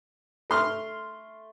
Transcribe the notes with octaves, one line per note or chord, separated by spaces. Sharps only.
A3 C6 F6